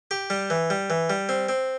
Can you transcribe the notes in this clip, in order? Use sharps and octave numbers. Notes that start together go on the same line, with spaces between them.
G4
G3
E3
G3
E3
G3
C4
C4